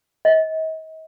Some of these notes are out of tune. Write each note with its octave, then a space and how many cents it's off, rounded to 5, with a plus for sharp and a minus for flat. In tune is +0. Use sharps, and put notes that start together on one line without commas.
D#5 +40